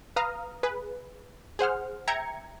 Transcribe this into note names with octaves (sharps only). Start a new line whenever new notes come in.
B4 F5 A#5 D#6 F6
G#4 B4
G#4 C5 F#5 F6
E5 G5 A#5 G#6 C#7